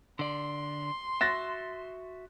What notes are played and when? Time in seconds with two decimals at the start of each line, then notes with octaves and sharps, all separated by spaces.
0.19 D3 D5 C6
1.21 F#4 E5 F#6 A6 A#6